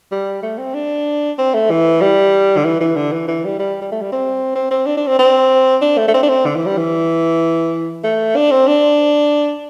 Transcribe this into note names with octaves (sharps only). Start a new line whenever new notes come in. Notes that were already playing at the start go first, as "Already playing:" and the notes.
G3
A3
C4
D4
C4
A3
E3
G3
D3
E3
E3
D3
E3
E3
G3
G3
G3
A3
G3
C4
C4
C4
D4
D4
C4
C4
D4
A3
A3
C4
D4
C4
D3
E3
G3
E3
A3
D4
C4
D4